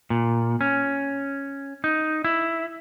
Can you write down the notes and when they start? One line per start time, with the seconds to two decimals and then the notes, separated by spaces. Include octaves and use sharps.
0.10 A#2
0.61 C#4
1.84 D#4
2.24 E4